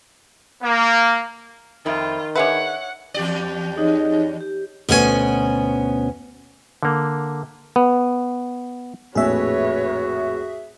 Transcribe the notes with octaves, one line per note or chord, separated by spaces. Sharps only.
A#3
F2 D#3 C4 E4 F4
D4 G#4 B4 C#5 E5 F#5
E2 G4 D5
D#4 G#4 C#5 D#5
G4
D2 B2 B3 C#4 E4 G#5
D3 A#3
B3
A#1 F2 A2 F#4 G#4 B4 C#5 E5